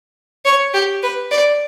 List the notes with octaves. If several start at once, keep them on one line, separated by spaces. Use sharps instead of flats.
C#5
G4
B4
D5